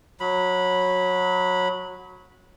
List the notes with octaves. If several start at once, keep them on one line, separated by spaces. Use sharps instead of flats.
F#3 B5